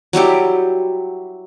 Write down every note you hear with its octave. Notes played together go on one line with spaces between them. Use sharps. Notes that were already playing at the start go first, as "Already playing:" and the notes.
F#3 G3 E4 G4